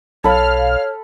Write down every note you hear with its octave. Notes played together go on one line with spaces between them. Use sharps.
B1 A4 C#5 F5 B5 F6